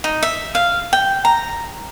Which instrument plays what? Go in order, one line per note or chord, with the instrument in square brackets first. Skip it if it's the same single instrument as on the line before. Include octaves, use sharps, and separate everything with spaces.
[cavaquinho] D#4
E5
F5
G5
A#5